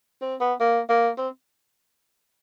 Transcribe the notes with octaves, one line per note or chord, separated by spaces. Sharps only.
C4
B3
A#3
A#3
C4